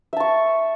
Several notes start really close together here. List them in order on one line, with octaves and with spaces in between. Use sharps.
E5 A5 C#6